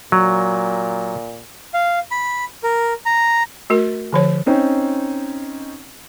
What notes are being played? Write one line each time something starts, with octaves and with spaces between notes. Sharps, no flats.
A#2 F#3
F5
B5
A#4
A#5
A3 F#4 A#4
D3 F3 C#5
C4 C#4 D#4 C5